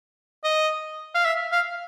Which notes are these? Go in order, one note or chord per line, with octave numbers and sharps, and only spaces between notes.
D#5
F5
E5
F5